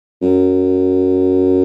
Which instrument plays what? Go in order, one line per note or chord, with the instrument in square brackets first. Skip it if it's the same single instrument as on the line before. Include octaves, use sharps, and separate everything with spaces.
[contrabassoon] F#2